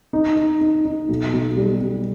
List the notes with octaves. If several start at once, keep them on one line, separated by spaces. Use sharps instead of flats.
D#4
D#4
D#4
D#4
B1
B1
G3
B2